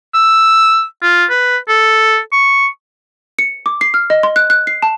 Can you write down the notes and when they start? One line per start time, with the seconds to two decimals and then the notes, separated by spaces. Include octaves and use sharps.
0.14 E6
1.02 F4
1.30 B4
1.68 A4
2.32 C#6
3.39 C#7
3.66 D6
3.81 C7
3.94 F6
4.10 D#5
4.23 C6
4.36 F#6
4.50 F#6
4.67 C7
4.82 A5